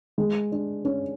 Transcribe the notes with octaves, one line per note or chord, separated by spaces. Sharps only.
G#3
D4
C#4